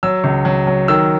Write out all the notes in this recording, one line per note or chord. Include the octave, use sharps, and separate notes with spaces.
F#3 E6
C#2
F#3
F#3
D#3 E6